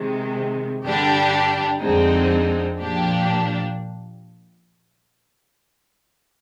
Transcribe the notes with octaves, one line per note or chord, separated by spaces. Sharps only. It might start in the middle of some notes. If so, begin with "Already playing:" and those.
Already playing: C3 D#3 G#3
G2 D3 G3 D4 G4
F2 D3 G#3 C4 D#4
A#2 F3 A#3 D4 G4